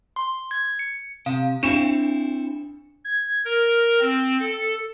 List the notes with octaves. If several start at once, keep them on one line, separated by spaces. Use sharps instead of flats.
C6
G#6
C#7
C3 F5
C4 D4 E4 C#7 E7
G#6
A#4
C4
A4